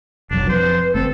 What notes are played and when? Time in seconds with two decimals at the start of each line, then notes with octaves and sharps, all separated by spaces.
0.31 F1 B1 F#3 D4
0.49 F2 B4 C5
0.95 G1 A3 C4 A4